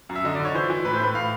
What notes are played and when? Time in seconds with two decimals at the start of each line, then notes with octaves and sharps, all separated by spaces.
0.09 F#2
0.16 E5
0.25 D3 D#5
0.35 D3 D5
0.45 C#5
0.55 E3 C5
0.70 E3
0.85 A2 B4
0.94 C5
1.00 A2 B4
1.14 A2 F5